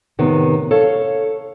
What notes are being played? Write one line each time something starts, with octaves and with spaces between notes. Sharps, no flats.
A2 C3 D#3 B3
A4 C#5 F5